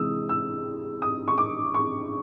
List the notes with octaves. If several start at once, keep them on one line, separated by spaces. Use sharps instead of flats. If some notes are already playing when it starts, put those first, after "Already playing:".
Already playing: C3 E3 G#3 D#6 E6
E6
D#6
C#6
D6
C#6